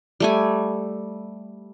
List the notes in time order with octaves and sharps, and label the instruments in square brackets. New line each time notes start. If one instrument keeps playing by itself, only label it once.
[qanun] G3 A3 G#5